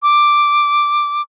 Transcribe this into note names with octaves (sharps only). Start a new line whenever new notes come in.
D6